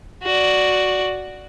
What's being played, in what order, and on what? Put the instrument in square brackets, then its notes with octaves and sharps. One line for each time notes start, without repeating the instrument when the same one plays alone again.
[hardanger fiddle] F#4 D5